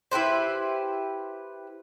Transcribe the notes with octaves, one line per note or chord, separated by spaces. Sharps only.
E4 G4 B4 C5